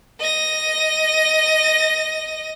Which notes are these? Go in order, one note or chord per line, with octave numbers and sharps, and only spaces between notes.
D#5 A#6